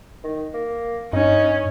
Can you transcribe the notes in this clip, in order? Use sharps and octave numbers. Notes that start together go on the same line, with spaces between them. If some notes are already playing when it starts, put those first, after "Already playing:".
D#3
A#3
G2 C#4 D#4